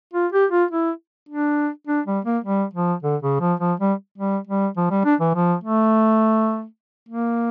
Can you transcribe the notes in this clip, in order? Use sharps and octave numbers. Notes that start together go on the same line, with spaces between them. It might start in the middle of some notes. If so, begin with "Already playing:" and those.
F4
G4
F4
E4
D4
D4
G3
A#3
G3
F3
D3
C#3
F3
F3
G3
G3
G3
F3
G3
D4
E3
F3
A3
A#3